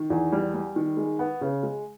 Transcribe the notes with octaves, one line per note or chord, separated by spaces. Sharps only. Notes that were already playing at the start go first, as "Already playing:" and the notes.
Already playing: D#3
E2
G3
G3
D#3
G#3
B3
C#3
G#3